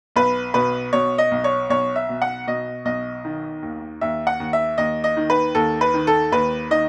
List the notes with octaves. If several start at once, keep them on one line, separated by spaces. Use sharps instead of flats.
B1 B4
B2 B4
B2 C#5
D#5
B1
C#5
B1 C#5
E5
B2
F#5
B2 D#5
B1 D#5
D#3
D#2
D#2 E5
F#5
D#2
E5
D#2 D#5
D#5
D#3
B4
D#2 A4
B4
D#3
A4
D#2 B4
D#3 D#5